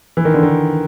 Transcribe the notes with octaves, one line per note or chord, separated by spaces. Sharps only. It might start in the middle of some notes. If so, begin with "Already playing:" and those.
E3
D#3
D3
D#3